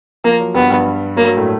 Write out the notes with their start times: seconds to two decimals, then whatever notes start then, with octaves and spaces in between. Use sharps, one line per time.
0.24 F3 A#3
0.40 F#3
0.54 G2 G3 B3
0.70 G2 G3
1.17 F#3 A#3
1.27 F#3
1.37 A2 A3